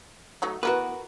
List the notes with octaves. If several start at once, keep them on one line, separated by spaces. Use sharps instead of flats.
F#3 A3 D#4
E3 B3 F#4 A#4 B4